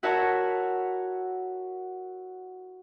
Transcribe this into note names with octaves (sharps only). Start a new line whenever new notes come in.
E4 F#4 A#4 C#5 E5 A5